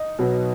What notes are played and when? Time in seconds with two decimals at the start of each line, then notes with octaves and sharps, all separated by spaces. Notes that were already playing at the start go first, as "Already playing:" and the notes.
Already playing: D#4
0.19 B2 F#3 B3